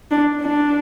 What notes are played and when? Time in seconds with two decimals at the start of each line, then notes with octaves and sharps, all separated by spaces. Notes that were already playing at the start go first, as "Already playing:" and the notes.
0.11 D4
0.41 D4